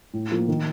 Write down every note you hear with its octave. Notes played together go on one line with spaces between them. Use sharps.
A2
F3 A#3
D#3